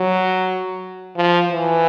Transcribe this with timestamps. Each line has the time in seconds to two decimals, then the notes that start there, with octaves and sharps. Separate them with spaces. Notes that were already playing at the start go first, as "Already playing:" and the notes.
Already playing: F#3
1.17 F3
1.51 E3